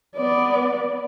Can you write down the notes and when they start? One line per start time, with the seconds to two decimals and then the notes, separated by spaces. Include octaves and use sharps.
0.17 B3 D5